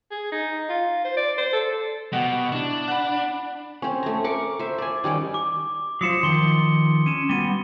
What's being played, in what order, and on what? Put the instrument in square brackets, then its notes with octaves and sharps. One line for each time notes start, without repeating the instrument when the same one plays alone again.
[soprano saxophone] G#4
D#4
F4
C5
D5
C5
A4
[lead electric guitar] B2 [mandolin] F#4 G4 D#5
[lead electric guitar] D4 [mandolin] E4
[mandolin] F#5 B5
[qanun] C4 C#4
A3 A#5
A#4 C#6 D6
C5 E5
D5 G#5
D#3 G3 C#4 G5
[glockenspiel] D6
[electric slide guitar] F#3 F4 C5 [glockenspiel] D#6 C#7 E7
[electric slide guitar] D#3 F3 [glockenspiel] C6 G7
[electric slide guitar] C#4 [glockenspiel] D#7 E7
[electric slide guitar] G3 B3 F#4 [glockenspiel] D#7 G7